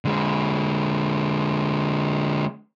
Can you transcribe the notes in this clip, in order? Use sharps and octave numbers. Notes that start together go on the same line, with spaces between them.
D3 G#3